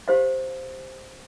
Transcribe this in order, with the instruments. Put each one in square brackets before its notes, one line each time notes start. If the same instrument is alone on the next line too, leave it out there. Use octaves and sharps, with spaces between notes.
[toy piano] G4 C5 F5